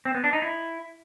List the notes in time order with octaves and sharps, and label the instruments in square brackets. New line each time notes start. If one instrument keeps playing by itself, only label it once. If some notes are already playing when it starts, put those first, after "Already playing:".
[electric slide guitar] C4
B3
D4
D#4
E4